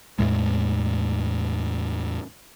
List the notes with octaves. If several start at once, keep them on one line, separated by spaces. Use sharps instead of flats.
E2 A2 G#3